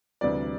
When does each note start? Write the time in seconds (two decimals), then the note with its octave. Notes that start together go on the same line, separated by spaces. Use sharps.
0.21 D2 C3 E3 G3 D5